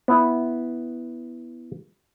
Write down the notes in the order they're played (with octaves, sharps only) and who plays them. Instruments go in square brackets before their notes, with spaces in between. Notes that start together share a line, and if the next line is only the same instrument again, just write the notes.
[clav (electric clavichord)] B3 E4